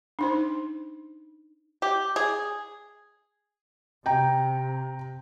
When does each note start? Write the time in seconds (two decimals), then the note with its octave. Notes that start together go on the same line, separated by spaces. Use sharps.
0.19 D4 D#4 C5
1.82 G4
2.16 G#4
4.06 C3 G5 A#5